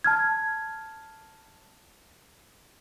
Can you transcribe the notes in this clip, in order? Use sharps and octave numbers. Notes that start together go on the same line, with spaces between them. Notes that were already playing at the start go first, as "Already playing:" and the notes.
A5 F6 G#6